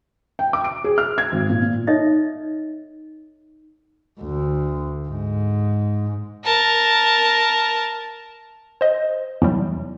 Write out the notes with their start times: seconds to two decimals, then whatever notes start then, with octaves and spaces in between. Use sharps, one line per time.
0.39 G5
0.53 D6
0.64 D7
0.84 G#4
0.98 F6
1.18 G#6
1.32 G#1
1.49 A#2
1.62 A#2
1.87 D#4 A4 C#5 D#5 E5
4.21 D2
5.08 G#2
6.44 A#4 A5
8.81 C5 D#5
9.42 E2 C3 F#3 G3